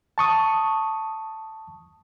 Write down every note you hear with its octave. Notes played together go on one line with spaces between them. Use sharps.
A5 C#6 D#6